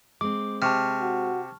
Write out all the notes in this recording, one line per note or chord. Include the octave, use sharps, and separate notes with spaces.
G#3 C4 D6
C3 A5 C#6 F6
F#4